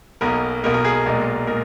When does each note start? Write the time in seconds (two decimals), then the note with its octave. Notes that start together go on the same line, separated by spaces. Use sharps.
0.21 B1 B2 A#3 A#4
0.64 B1 B2 A#3 A#4
0.74 A#4
0.85 G#4
0.95 A#4
1.06 B1 A#2 G#3
1.47 A#2 G#3 A#4